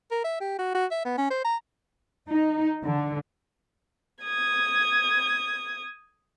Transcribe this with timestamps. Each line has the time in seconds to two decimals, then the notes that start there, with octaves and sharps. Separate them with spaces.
0.11 A#4
0.24 E5
0.40 G4
0.59 F#4
0.75 F#4
0.91 E5
1.05 B3
1.18 C#4
1.30 C5
1.45 A#5
2.28 D#4
2.83 D3
4.23 D#6 G#6